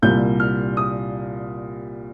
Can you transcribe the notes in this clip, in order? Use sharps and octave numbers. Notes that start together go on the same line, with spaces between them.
C2 A#2 G3 G6
F6
D#6